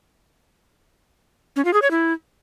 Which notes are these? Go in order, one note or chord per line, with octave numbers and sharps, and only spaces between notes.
C#4
F4
G#4
C#5
E4